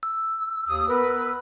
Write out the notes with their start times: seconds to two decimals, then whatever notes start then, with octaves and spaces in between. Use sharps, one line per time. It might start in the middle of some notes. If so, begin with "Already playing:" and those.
0.03 E6
0.69 D#2 D#6
0.89 B3 A#4 B4